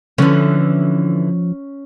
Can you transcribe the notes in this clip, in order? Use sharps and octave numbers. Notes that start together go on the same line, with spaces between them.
D3 E3 F3 C#4